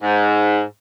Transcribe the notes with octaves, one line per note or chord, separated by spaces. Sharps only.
G#2